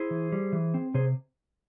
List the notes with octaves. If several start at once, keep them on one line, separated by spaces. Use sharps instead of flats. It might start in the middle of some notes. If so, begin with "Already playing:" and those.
Already playing: E4 G#4 C5
E3
G3
E3
C4
C3 G#4 C5